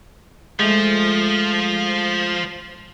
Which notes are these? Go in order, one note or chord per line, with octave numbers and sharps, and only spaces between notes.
F3 G#3 A3